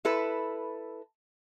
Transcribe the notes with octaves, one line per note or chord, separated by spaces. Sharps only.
E4 A4 B4